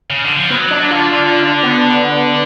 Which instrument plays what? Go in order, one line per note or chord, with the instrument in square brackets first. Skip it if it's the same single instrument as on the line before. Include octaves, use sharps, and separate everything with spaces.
[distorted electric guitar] C#3
D3
F3
[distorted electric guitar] F#3 [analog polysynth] B3
[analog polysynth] D4
[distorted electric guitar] D3 [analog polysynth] F4
[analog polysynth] F4
F4
D4
B3